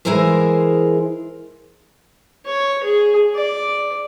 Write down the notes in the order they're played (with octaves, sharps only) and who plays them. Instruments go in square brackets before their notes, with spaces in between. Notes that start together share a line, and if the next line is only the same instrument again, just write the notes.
[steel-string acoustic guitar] E3 G#3 E4 G#4 A#4 C5
[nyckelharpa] C#5
G#4
D5